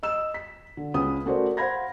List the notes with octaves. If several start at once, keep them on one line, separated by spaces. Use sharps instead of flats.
D#5 E6 E7
B6
D3
C#2 C#4 B4 D#6
A3 C#4 F#4 A#4 C5 D5
C5 F5 F#5 B5 G#6 A#6